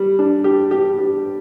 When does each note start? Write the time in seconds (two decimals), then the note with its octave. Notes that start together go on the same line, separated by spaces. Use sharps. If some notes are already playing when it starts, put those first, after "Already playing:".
Already playing: G3
0.19 D4
0.44 G4
0.71 G4
0.98 G4